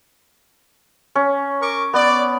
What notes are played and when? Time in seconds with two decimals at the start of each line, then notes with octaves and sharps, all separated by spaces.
1.15 C#4
1.61 A#4 C#6 D6
1.94 B3 D5